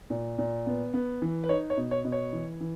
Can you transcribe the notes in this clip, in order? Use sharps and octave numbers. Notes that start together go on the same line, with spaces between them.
A#2
A#2
B3
B3
E3
B4
D#4 C#5
C#5
B2
C#5
B2
C#5
E3
E3